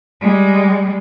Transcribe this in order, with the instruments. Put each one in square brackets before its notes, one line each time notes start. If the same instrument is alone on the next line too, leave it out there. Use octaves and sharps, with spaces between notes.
[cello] G3 G#3